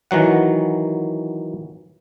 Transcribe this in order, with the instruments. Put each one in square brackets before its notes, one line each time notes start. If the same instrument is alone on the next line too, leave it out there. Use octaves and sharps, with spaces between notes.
[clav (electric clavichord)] D#3 E3 F#3 F#5